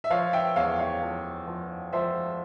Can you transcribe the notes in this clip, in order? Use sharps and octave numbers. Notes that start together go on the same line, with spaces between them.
E5
F3 C#5 F5
E5 G5
E2 C#5 F5
C#5 F5
F3
F3
F3 C5 E5